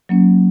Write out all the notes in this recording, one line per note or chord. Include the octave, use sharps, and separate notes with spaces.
F#3 A#3 C#4